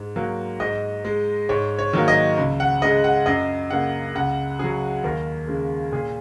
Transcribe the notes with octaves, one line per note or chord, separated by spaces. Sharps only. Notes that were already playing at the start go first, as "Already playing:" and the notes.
Already playing: G#2
F#3 A#3
G#2 D#5
G#3
G#2 C#5
C#5
D#3 F#3 A#3
D#5
C#2
F#5
C#3 G#3 D#5
F#5
F#2 D#5
C#3 A#3 F#5
C#2 F#5
C#3 F#3 G#4
D#2 A#4
C#3 G#3
A#2 G#4